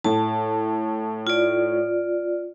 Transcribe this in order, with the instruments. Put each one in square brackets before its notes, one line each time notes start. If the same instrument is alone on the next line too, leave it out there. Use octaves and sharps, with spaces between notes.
[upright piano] A2 [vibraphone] A5
[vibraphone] F4 D5